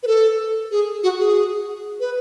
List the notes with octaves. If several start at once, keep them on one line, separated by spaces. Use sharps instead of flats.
B4
A4
G#4
F#4
G#4
B4